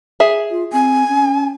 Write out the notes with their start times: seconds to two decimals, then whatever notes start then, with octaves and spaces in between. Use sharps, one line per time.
0.20 G#4 E5
0.50 F4
0.73 C4 G#5
1.08 C#4